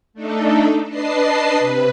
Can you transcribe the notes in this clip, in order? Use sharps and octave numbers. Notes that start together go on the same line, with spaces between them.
A3 D4 D#4 A4
D4 B4 D#5 A5 C7
C3 B4